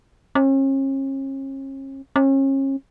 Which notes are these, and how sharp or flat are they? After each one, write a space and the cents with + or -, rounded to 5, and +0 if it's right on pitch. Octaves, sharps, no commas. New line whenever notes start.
C#4 -40
C#4 -35